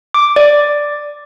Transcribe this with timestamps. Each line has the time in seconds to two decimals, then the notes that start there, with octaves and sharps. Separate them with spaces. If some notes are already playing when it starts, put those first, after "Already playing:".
0.14 D6
0.36 D5